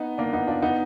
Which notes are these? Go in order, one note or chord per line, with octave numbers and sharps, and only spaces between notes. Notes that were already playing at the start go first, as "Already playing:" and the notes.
Already playing: B3 D#4
A#3 D4
B3 D#4
D4 F4
B3 D#4